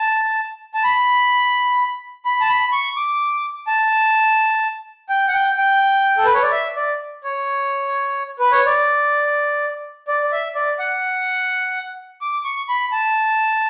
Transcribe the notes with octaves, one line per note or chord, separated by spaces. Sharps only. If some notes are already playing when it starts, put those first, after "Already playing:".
Already playing: A5
A5
B5
B5
A5
B5
C#6
D6
A5
G5
F#5
G5
G5
A4
B4
C#5
D5
E5
D5
C#5
B4
C#5
D5
D5
D5
E5
D5
F#5
D6
C#6
B5
A5